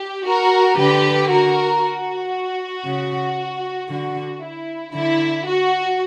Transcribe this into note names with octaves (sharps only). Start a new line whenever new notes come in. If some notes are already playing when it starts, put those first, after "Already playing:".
Already playing: G4
F#4 A#4
D3 G4 B4
F#4 A#4
F#4
C#3
D3 F#4
E4
D3 E4
F#4